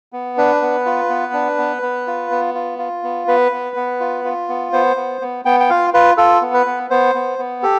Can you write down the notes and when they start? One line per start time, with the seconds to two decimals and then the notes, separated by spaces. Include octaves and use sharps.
0.13 B3
0.37 D4 B4
0.62 B3
0.86 F4
1.09 B3
1.33 D4
1.58 B3
1.82 B3
2.07 F4
2.31 B3
2.54 F4
2.78 F4
3.03 B3
3.28 B3 B4
3.52 B3
3.76 B3
4.00 F4
4.25 F4
4.48 B3
4.73 B3 C5
4.96 B3
5.21 B3
5.45 B3 G5
5.60 G5
5.70 F4 F5
5.94 F4 B4
6.17 F4 A4
6.41 B3
6.54 B4
6.66 B3
6.90 B3 C5
7.15 B3
7.39 B3
7.63 G4 A4